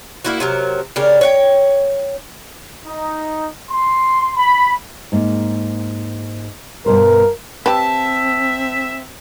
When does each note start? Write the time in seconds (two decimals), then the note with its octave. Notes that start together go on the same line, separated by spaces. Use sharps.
0.25 A#3 E4 F#4
0.40 C3 F#3 A#4
0.96 C#3 D4 G4 A#4
1.21 C#5 F#5 G5
2.86 D#4
3.69 C6
4.37 B5
5.12 G#2 A#3
6.86 G2 B2 A#4 C5
7.66 C4 G4 B4 E5 A5